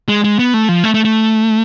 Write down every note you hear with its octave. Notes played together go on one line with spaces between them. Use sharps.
G#3
G#3
B3
A3
F3
A3
A3
A3